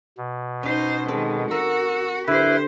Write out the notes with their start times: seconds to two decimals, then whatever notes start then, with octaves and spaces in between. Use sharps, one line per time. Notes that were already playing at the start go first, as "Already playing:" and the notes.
0.17 B2
0.63 C#4 D#4 C5
1.08 D#3 G#3 C4 A4
1.51 F#4 A#4 E6
2.28 D3 E4 G4 B4 C5 E5